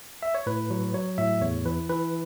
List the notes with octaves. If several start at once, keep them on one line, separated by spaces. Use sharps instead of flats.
E5
C#5
A2 B4
F#3
F#3 C#5
A2 E5
E2 C#5
E3 B4
E3 B4